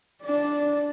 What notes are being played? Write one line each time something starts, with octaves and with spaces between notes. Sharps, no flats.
D4 D5